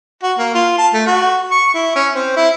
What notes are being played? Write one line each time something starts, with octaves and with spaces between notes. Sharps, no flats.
F#4
A#3
F4
A5
A3
F#4
C#6
E4
C#4
C4
E4